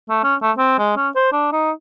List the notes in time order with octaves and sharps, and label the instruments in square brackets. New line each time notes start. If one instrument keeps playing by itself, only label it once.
[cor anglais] A3
C#4
A3
C4
G#3
C#4
C5
D4
D#4